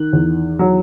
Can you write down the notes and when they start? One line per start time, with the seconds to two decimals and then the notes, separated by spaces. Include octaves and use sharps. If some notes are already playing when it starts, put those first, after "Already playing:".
Already playing: D#3 F#6
0.13 E2
0.59 F#3